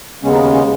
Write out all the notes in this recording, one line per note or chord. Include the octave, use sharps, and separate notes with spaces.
D#2 C#3 G#3 B3 C#4
D#4
C#4
C#4